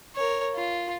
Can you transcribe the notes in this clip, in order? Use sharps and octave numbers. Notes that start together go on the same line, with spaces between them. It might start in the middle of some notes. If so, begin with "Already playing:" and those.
A#4 C#5
F4